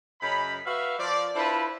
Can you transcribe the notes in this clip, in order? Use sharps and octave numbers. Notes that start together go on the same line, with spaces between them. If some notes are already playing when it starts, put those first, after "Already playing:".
F#2 C#3 D#5 B5
F#4 B4 E5 F5
F3 D5
D4 E4 F4 A4 B4 C5